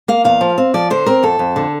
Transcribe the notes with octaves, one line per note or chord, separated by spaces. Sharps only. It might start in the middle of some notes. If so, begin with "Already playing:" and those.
A#3 F5
E2 F5
F3
C4
F3 D5
D3 C5
C4 A#4
F2 A4
F2
D3